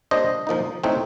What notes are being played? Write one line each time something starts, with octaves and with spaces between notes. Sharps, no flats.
A#2 G3 D4 C5 D#5
A#2 F3 A#3 D#4
A2 A3 C4 D#4